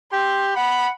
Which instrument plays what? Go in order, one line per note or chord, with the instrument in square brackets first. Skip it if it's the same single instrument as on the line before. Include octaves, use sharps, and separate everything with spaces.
[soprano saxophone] G4 [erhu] C6
[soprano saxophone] F#5 [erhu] B5